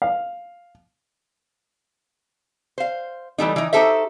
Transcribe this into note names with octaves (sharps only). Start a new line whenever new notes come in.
F5
C5 F5
E3 G3 A3 D#4
E3 D#4
D#4 F#4 G4 A4 C5 E5